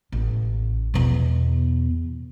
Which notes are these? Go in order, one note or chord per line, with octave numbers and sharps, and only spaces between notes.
A1
E2 B2